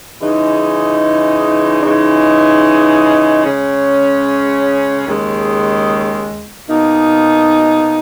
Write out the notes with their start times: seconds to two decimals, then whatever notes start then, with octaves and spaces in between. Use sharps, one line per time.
0.20 C#3 E3 G#3 D#4
1.83 C#3 E3 G#3 D#4
3.45 C#3 G#3 C#4
5.06 D#2 C#3 G#3
6.68 B2 A#3 D#4